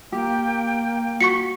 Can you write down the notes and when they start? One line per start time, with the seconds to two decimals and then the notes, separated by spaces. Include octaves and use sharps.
0.12 A#3 G4 G5
1.21 F#4 C#6 B6 C#7